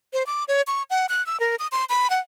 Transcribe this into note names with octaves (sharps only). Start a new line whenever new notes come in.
C5
D6
C#5
C#6
F#5
F#6
E6
A#4
D#6
C6
B5
F#5